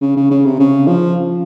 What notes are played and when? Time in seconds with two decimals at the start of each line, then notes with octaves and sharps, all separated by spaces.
0.01 C#3
0.17 C#3
0.31 C#3
0.45 C3
0.59 C#3
0.87 F3